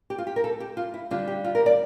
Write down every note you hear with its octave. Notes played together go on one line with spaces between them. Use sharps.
G4
F4
G4
A#4
A4
G4
F4
E4
D3 G3 D4 F4
G4
F4
A#4
D5